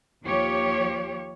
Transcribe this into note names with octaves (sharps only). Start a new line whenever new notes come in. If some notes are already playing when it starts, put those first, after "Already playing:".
D#2 F3 G4 C#5